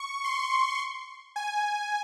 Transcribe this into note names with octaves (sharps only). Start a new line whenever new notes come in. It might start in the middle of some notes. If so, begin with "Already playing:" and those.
Already playing: C#6
C6
G#5